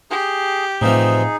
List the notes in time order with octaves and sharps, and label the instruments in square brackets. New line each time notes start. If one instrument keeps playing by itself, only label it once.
[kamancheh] G4 [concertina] G#4
[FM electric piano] A2 F5 [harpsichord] C3 E3 F3 [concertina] D#4 G#4